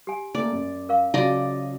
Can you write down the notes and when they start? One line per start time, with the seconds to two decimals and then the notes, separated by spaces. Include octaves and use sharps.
0.07 G4 G#5
0.35 A3 A#3 D5
0.52 F#2
0.89 A#4 F5 C#6
1.14 C#3 F#3 D#4 F4 F#4 D5 D#5